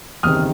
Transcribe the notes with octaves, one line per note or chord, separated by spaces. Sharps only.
F#1 E2 C3 D#3 D#6 F6